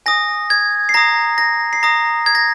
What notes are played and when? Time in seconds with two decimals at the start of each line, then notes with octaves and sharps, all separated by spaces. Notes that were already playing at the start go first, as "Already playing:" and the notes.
0.06 G#5 D#6 A#6
0.50 G#6
0.89 C7
0.94 A#5 D#6 A#6
1.38 A#6
1.73 C7
1.83 A#5 D#6 A#6
2.26 G#6
2.35 A#6